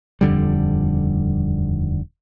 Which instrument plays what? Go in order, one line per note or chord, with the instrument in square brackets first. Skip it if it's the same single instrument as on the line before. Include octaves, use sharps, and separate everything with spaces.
[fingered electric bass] D#1 F2 D3 G3